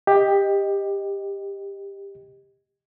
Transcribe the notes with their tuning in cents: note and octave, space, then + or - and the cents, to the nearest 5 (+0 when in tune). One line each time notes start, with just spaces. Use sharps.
G4 +15 D#5 +0